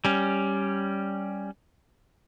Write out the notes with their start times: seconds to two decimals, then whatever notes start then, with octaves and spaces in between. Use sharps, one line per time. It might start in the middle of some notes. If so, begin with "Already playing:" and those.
0.05 G3 C#4